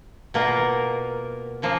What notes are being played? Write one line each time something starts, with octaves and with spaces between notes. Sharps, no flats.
B2 A#3 F4 A#4
C#3 F3 A#3